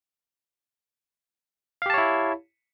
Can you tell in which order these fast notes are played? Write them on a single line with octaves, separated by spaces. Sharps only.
F5 G4 A5 C#5 E4